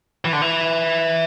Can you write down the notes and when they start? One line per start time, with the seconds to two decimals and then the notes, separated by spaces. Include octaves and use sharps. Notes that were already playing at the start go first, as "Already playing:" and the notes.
0.25 E3
0.33 D3
0.41 E3